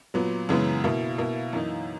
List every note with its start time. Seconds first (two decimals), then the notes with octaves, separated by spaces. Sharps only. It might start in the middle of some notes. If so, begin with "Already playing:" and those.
0.14 A#2 F#3 B3
0.49 F#2 C#3 E3 G#3 B3
0.84 B2 A#3 E4
1.18 B2 A#3 E4
1.53 F#2 E3 A#3 D#4